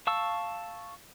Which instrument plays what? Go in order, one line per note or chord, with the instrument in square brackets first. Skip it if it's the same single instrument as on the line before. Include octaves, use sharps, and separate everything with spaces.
[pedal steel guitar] F5 A5 C#6 E6